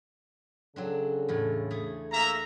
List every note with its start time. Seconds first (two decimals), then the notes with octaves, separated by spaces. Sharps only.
0.76 C#3 F#3 C4 D4 A4
1.28 E2 A2
1.71 A3 G#4
2.12 A#3 E5 A#5